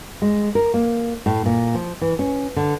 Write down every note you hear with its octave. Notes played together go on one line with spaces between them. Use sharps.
G#3
A#4
A#3
A2
A#2
F3
E3
C#4
D3